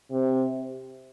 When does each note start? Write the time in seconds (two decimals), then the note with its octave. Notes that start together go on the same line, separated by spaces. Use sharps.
0.11 C3